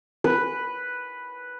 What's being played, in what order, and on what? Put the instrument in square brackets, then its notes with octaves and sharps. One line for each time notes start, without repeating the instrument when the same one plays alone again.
[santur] B4